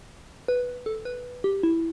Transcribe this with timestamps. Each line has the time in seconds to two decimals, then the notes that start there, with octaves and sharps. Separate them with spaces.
0.48 B4
0.86 A4
1.05 B4
1.44 G4
1.63 E4